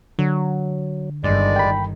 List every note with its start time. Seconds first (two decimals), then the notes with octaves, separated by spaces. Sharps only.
0.19 D3 F#3
1.24 G1 G2 D#3 G#3 D5
1.56 G5 B5